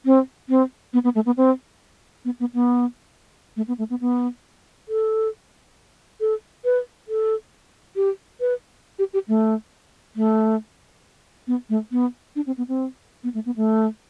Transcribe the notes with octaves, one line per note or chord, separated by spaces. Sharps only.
C4
C4
B3
B3
A3
B3
C4
B3
B3
B3
A3
B3
A3
B3
B3
A4
A4
B4
A4
G4
B4
G4
G4
A3
A3
B3
A3
B3
D4
C4
B3
C4
B3
A3
B3
A3